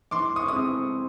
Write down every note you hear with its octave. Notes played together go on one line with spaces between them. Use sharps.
E3 C6 D6
C#6 D#6
G#3 C4 E4 D#6